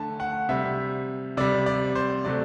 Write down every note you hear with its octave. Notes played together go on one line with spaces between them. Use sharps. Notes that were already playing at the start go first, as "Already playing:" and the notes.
Already playing: D3 A3 A5
F#5
C3 G3 E5
C3 G3 D5
D5
C5
C3 F#3 A3 D5